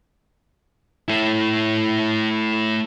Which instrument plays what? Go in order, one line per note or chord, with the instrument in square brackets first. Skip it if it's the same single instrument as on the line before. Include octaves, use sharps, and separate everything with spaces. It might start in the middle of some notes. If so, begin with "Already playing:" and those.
[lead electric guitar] A3 E4